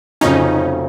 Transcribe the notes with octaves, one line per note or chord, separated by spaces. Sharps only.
F1 F2 C#3 F#3 C#4 D#4